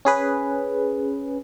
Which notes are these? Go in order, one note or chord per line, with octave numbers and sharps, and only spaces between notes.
C#4 G#4 B4